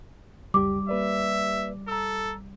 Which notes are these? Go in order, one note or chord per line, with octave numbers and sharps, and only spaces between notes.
C#2 F#2 G3 G4 D6
A#3 B4 D5 E5
A4 A#5 E6